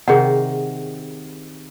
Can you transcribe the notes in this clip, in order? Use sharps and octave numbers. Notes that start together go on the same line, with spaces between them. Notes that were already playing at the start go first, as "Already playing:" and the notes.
C3 D#3 G#4 F#5